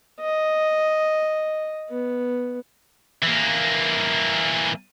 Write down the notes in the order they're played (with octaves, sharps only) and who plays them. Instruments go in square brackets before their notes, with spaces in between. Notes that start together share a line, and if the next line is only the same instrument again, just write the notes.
[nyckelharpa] D#5
B3
[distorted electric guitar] E3 A#3